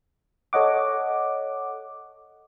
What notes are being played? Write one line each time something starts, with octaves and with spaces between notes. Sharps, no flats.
A4 C#5 D#5 F#5 D6